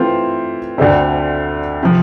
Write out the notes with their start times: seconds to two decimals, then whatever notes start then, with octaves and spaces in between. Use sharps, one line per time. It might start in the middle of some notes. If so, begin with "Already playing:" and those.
Already playing: E3 A3 C4 F4
0.78 D2 D3 A3 C4
1.83 C3 F3